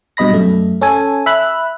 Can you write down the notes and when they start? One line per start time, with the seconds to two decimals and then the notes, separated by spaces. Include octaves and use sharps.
0.17 G2 B2 D#5 B5 A#6
0.34 F#2 A3
0.81 C#4 A4 G#5
1.26 E5 B5 F#6